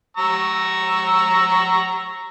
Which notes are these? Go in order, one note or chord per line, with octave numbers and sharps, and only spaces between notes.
A#5 C#6 E6